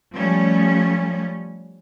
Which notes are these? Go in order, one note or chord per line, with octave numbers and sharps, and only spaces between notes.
F3 G3 A3 C#4